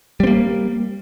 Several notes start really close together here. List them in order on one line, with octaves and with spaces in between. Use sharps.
G3 C4 A#3